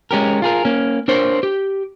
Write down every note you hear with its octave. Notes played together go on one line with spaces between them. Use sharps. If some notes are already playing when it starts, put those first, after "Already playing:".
G#3 C#4 G4 A#4
F4 G#4 A#4
A#3 C#4
D4 A#4 C5 C#5
G4